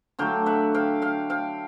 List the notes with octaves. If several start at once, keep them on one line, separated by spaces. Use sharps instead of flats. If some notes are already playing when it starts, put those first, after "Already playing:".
D3 F#3 A3 F5 G5
E5 F#5
F5 G5
F5 G5
F5 G5